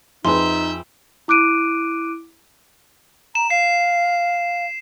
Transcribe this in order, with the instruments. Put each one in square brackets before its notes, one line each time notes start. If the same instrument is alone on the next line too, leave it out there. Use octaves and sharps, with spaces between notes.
[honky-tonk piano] F2 G#4 B4 [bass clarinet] D#4 [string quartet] E5 G6 [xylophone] C6
[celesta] E4 D6 F#6 D7 D#7
[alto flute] A#5 [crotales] E7
[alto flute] F5 [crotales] C7